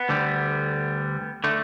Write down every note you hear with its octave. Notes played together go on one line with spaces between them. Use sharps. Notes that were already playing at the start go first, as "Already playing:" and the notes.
Already playing: B3
D2 D3 G3
D3 A3